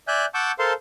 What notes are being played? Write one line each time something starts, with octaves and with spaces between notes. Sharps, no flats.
D5 E5 G#5 F#6 G6
F#5 A5 C#6 D6 E6 G6
A4 A#4 C5 F5 A5 C6